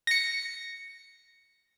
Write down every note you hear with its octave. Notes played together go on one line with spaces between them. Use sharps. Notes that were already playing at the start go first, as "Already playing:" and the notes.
A#6 C#7